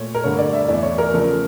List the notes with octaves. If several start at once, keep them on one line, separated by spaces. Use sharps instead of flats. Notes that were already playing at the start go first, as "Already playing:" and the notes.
Already playing: A#2 A3 C#5
A#4
G2 D3 A3 C#5
D5
E5
E2 E3 A3 D5
C#5
A#4
C#3 F3 A3